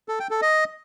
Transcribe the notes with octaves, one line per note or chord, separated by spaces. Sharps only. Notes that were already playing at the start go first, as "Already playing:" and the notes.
A4
G5
A4
D#5